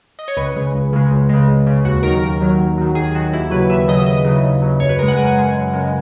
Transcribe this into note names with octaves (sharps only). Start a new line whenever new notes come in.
D#5
C#5
C#2 B4
C#3 G#3
C#2
C#3 G#3
C#2
C#3 G#3
C#2
C#3 G#3
D#2 F#4
D#3 F#3 A#4
D#2
D#3 F#3
D#2
D#3 F#3
D#2 G#4
D#3 F#3 F#4
D#2 E4
C#3 F#3 B4
D#2 E5
C#3 F#3 D#5
D#2 D#5
C#3 F#3
D#2
C#3 F#3
F#2 C#5
B4
C#3 G#3 A#4
F#5
F#2 G#5
C#3 G#3
F#2
C#3 G#3